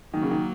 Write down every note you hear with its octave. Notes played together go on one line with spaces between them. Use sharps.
D#3 F#3 A#3
C#3
D#3